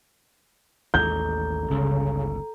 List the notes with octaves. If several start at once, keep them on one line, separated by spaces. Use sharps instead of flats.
A1 D#2 G#3 A4 A#5 G6
G1 C#2 C#3